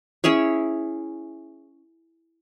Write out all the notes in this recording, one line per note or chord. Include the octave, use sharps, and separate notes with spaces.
C#4 E4 G#4 C#5